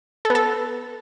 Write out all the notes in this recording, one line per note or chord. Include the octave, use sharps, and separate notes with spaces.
A4
B3
A4